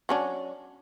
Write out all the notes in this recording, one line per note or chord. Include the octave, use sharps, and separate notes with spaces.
F#3 C#4 D4